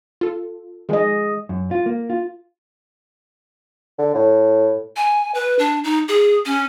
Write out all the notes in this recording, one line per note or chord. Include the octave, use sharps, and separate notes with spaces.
F4 A4
D#3 F3 G#3 G#4 D#5
F#2
F4
A#3
F4
D3
A2
G#5
B4
D4
D#4
G#4
C#4